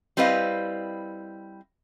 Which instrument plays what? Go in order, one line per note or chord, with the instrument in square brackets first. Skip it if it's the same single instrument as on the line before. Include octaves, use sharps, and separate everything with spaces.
[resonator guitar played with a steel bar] G3 C4 E4 B4 D#5 F5